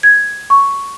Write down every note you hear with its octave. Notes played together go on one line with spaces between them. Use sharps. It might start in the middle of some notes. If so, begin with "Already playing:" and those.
G#6
C#6